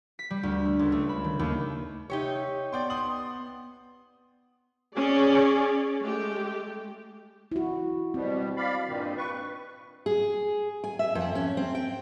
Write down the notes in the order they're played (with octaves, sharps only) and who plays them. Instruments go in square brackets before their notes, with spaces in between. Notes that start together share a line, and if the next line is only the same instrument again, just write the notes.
[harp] B6
G3
D2
A3
C#2
A3
B5
D#3
D#2
[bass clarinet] C3 [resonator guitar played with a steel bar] D#4 G4 C#5
[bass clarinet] B3 [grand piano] D5 G5 C6
[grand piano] C6 D#6 F#7
[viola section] C#4 G#4 D5
G#3 A3 G4
[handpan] E4 F#4
[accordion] B2 G3 [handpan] C4
[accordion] D5 F5 B5
G2 A#2 D#3
B4 C#6
[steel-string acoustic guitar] G#4
G#5
E5
F2
C#4
C4
G5